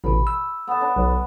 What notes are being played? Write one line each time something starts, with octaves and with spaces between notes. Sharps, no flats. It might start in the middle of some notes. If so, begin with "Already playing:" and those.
A1 B2 B5
E6
B3 A5
D4
B1